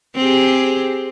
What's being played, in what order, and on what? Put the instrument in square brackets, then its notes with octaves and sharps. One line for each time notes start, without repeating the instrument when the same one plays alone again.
[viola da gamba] C4 G4 G#4